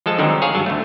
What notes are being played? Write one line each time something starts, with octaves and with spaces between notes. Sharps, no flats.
F3 G#3 A4 A5
D3 D#3 F#3 G#3 C4 D#4
G#4 C#5 F5
G2 F#3 A5
D2 A3